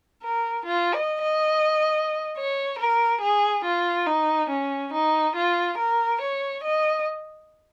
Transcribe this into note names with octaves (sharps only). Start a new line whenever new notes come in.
A#4
F4
D#5
D#5
C#5
A#4
G#4
F4
D#4
C#4
D#4
F4
A#4
C#5
D#5